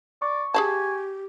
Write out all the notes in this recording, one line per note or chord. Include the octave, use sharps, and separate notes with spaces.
D5 C#6
G4 G#4 F5 G#5 A5